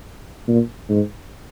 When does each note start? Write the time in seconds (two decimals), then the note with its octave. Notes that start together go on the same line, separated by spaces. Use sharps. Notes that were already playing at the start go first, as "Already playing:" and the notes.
0.48 A#2
0.89 G#2